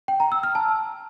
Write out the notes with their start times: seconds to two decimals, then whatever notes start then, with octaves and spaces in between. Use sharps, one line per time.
0.08 G5
0.20 A#5
0.32 E6
0.43 F6
0.55 A5